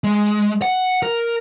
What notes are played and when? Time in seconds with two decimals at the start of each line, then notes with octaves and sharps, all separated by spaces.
0.04 G#3
0.62 F#5
1.03 A#4